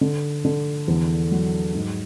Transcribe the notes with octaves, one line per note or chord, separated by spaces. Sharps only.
D3
D3
E2
F#3
G#2